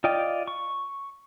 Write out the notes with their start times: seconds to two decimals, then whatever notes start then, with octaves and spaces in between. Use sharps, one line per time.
0.04 F4 D5 D#5 G5
0.48 C#6